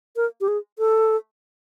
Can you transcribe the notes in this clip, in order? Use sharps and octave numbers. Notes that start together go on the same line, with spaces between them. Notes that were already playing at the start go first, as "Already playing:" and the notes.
A#4
G4
G#4
A4